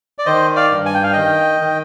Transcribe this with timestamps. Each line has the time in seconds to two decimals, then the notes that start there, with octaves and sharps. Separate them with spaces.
0.18 D5
0.26 D#3 C5 D#5
0.56 D5 F5
0.72 G2
0.86 G#5
0.94 G5
1.03 F5
1.12 D#3 D#5 G5
1.61 D#3